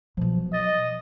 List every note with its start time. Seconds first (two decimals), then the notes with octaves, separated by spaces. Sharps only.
0.17 B2 F3 F#3
0.53 D#5 A6